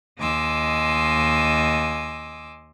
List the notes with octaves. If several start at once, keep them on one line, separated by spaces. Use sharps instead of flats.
D#2 D#5 G#5 C6 D6 E6